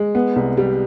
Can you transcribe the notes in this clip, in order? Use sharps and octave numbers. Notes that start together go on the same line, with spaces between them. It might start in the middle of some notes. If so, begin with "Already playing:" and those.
Already playing: G#3
B3
C2
G3